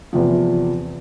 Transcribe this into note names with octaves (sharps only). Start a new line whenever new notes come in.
E2 C3 F3